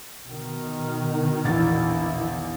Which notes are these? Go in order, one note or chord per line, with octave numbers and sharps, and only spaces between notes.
B2 D#3
A#1 E2 E4 A6